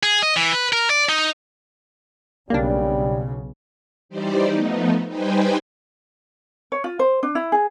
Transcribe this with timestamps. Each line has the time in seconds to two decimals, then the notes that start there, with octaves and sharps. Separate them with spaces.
0.03 G#4
0.22 D#5
0.37 E3
0.53 B4
0.73 A#4
0.90 D5
1.09 D#4
2.50 B1 C#3 G3 A#3 D4
4.09 E3 G3 D#4 G4 C5 D5
4.50 F3 A3 B3 D#4
5.07 G3 D#4 B4 C5 G5 G#5
6.72 C#5
6.84 F4
6.99 C5
7.23 D4
7.35 E4
7.52 G#4